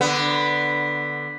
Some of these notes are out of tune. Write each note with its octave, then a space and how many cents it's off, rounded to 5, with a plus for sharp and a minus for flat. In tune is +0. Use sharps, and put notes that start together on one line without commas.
D3 +0 B3 +0